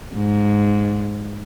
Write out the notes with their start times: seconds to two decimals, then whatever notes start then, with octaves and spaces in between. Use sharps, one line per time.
0.15 G#2